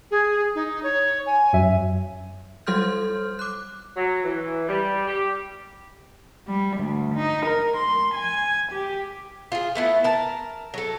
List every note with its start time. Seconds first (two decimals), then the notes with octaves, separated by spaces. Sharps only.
0.11 G#4
0.55 D#4
0.83 C#5
1.26 G#5
1.53 F#2 F#3 E5
2.67 F#3 G3 A4 C6 F6 G6
3.39 D6 F#6
3.96 F#3
4.24 E3
4.69 G3
5.07 G4
6.47 G3
6.76 D2
7.14 D#4
7.46 A#4
7.76 C6
8.13 G#5
8.70 G4
9.52 F4 G#4
9.75 A3 B3 E4
10.04 A#4 A5
10.74 F#3 A4